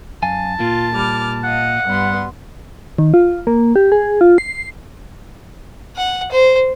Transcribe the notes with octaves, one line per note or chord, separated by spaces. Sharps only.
F#2 F5 G#5 A5
A#2 A#3 F4
G3 D6 F6
D#5 F5 F#5
G2 G3 B3 C6
D#3
F4
A#3
G4
G#4
F4
C7
F#5
C5